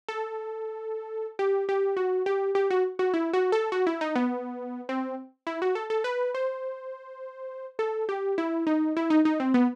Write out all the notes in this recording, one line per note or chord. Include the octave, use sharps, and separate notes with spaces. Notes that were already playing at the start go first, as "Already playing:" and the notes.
A4
G4
G4
F#4
G4
G4
F#4
F#4
E4
F#4
A4
F#4
E4
D#4
B3
C4
E4
F#4
A4
A4
B4
C5
A4
G4
E4
D#4
E4
D#4
D#4
C4
B3